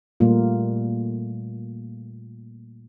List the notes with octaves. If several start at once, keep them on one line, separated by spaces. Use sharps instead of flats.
A#2 G3 A3 A#3 F4